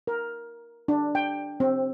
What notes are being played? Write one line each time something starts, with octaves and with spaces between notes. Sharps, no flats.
A#4
D4
G5
C4